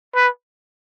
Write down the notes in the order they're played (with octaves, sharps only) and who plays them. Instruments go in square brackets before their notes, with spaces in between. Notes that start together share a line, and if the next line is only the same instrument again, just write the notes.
[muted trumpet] B4